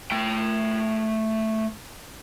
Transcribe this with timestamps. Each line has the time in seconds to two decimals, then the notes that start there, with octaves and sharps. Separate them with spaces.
0.12 A3 G5